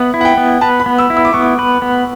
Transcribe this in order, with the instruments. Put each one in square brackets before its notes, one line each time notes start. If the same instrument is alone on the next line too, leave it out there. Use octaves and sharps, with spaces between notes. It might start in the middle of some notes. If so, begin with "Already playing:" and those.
Already playing: [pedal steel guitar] B3 [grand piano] E5 F#5
[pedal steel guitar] E4
[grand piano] F#5
G5
[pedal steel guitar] B3
[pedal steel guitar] B4 [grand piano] A5
[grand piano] B5
[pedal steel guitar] B3
[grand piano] E6
[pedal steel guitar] E4
[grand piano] E6
D6
[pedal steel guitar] B3 [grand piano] C#6
[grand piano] D6
[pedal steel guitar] B4
B3